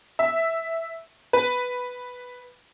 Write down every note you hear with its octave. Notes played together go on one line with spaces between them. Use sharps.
E5
B4